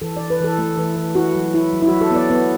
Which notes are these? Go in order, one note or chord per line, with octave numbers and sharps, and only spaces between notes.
E3 A4
E3 D5
B4
E3 A4
A3
E3
E3
E4 F#4
F#3
E4
F#3
E4
F#3 F#4
A4
B3 D5
B3